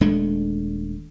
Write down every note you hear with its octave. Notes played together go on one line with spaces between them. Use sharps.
D#1 G#3 A3 D4